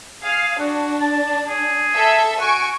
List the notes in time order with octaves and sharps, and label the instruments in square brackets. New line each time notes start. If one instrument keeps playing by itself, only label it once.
[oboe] G#4 [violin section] F5
[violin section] D4 [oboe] F#4
[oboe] A5
G#4
[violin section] A4 E5
[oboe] F#4 [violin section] G#5 C#6 D7